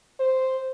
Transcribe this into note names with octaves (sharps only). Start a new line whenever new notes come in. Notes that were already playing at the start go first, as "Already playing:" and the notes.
C5